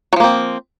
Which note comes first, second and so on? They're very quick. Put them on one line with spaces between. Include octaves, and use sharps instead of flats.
F#3 F3 A#3 C4